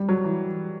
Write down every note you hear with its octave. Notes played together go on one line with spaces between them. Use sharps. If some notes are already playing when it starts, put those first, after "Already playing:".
Already playing: G3
F#3
E3